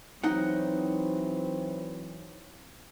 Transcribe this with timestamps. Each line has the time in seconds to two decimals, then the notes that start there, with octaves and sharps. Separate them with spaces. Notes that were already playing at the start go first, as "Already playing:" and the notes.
0.24 E3 F#3 C4 D#4 F#5